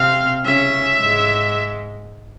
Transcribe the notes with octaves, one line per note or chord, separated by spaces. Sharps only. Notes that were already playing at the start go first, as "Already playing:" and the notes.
Already playing: C3 C4 F5
C#3 C#4 E5
G#2 G#3